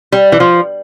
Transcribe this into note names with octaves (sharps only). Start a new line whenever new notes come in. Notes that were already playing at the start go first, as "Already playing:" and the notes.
G3
E3
F3